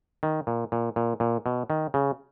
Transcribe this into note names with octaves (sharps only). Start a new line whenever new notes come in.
D#3
A#2
A#2
A#2
A#2
B2
D#3
C#3